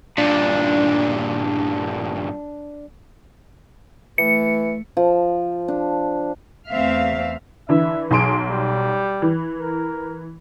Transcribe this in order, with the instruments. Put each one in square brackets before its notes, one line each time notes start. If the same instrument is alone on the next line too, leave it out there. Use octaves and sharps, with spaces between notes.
[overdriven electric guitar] G2 A#2 [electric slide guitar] D4
[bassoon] E3 [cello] A3 [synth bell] C#7
[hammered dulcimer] F3
D4
[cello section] E2 A3 C4 E5 F5
[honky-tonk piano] D3 E3 [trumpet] E5
[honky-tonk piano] B1 C6 D7 [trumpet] G#4
[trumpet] G3
[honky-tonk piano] E3
[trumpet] A#4